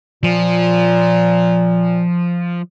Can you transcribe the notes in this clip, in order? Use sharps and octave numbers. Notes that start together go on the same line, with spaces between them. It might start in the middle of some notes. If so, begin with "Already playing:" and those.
A#2 F3